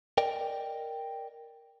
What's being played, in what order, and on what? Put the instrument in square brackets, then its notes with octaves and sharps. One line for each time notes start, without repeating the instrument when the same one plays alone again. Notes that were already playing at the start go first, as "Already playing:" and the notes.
[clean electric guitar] A#4 D5 D#5 G5